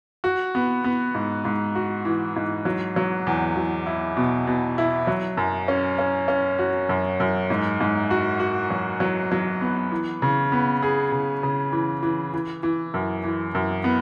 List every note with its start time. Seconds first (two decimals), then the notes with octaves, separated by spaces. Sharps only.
0.24 F#4
0.55 B3
0.84 B3
1.15 G#2
1.45 G#2
1.75 F#4
2.05 E3
2.36 G#2
2.65 F#3
2.96 F#3
3.27 E2
3.56 F#3
3.86 E4
4.17 B2
4.47 B2
4.78 E4
5.07 F#3
5.37 F#2
5.68 C#4
5.99 C#4
6.28 C#4
6.59 F#4
6.89 F#2
7.20 F#2
7.50 G#2
7.80 G#2
8.11 F#4
8.40 F#4
8.70 F#3
9.00 F#3
9.32 F#3
9.61 B3
9.91 E3
10.22 C#3
10.52 B3
10.82 G#4
11.12 C#3
11.43 C#3
11.72 E3
12.03 E3
12.34 E3
12.63 E3
12.94 F#2
13.24 E3
13.55 F#2
13.84 B3